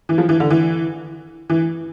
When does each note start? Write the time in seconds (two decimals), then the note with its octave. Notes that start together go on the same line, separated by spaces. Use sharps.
0.09 E3
0.18 F3
0.29 E3
0.40 D3
0.50 E3
1.50 E3